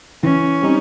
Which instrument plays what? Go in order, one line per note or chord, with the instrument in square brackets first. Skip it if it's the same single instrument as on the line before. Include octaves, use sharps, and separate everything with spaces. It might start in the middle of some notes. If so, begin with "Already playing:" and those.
[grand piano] E3 [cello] C#4
[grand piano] G3 C4 D#4